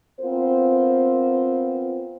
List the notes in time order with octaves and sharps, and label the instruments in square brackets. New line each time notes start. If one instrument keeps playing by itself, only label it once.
[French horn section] B3 C4 F4 A#4 C5